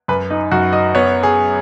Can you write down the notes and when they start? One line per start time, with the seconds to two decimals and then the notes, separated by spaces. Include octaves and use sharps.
0.08 F#2 B4
0.30 D#4
0.51 F#2 F#4
0.73 D#5
0.95 B3 C#5
1.23 G#4